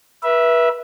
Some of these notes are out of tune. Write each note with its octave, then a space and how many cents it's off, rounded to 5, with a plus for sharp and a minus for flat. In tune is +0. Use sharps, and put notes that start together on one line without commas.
B4 -30 E5 +0